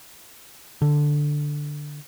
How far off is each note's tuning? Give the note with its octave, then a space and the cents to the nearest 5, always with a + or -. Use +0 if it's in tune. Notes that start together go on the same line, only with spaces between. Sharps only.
D3 +5